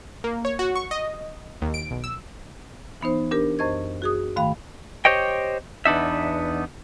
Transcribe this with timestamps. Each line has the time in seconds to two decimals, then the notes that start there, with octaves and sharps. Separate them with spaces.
0.24 A#3
0.45 C#5
0.59 F#4
0.75 C#6
0.91 D#5
1.62 D#2
1.74 D7
1.91 B1
2.04 E6
3.01 E3 B3 D#4 C5
3.31 D4 G4 A#4
3.59 F#2 C5 D#5 C#6 G#6
4.02 F#4 G#4 D#6
4.36 G#2 D#3 A3 F5 G5 B5
5.05 G4 C5 C#5 D#5 G5
5.86 E2 B3 D4 D#4 E5